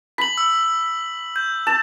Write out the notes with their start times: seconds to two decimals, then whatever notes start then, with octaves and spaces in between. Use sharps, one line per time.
0.18 B5 B6 F#7
0.38 E6
1.36 G6
1.67 A5